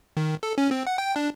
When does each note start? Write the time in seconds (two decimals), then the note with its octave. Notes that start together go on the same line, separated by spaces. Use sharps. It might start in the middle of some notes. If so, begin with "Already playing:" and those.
0.17 D#3
0.43 A4
0.58 C#4
0.71 C4
0.87 F#5
0.98 G5
1.16 D4